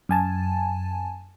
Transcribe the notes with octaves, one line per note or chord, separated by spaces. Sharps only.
F#2 G#5 A5